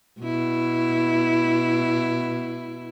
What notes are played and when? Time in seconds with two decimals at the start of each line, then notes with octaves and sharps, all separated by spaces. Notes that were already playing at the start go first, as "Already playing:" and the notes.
0.20 B2 E4